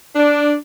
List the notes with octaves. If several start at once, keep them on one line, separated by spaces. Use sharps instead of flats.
D4